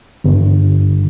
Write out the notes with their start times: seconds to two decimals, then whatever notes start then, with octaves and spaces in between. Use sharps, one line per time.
0.24 G1